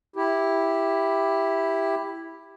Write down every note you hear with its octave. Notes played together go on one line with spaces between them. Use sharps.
E4 G4